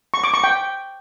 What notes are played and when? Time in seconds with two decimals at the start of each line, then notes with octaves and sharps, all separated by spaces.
0.14 C#6
0.24 D6
0.34 C#6
0.44 G5